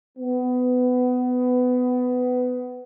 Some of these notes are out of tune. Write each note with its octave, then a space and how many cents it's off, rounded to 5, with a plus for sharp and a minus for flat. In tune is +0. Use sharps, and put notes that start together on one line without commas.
B3 +20